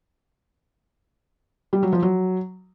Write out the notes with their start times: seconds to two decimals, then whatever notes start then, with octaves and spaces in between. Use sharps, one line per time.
1.73 G3
1.83 F#3
1.93 F3
2.02 F#3